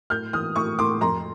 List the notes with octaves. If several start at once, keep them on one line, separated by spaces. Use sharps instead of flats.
A2 F6 G6
E3 D#6 F6
A2 C#6 D#6
A2 C6 D6
F2 A#5 C6